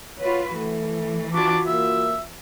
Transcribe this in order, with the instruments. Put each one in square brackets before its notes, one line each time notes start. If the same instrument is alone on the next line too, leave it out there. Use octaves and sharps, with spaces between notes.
[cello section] F4 F#4 B4 [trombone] C#5
[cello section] E3 [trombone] A3
[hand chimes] F4 F#4 [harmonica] A5 C#6 D6
[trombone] A#3 [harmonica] E5